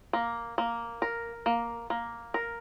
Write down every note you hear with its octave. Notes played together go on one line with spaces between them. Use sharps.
A#3
A#3
A#4
A#3
A#3
A#4